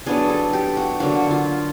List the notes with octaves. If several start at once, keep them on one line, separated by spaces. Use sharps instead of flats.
F#3 B3 D4 G#4
A4
G4
F#4
D3 F#3 A#3 F#4
F4